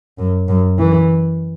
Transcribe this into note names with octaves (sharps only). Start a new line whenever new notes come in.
F#2
F#2
E3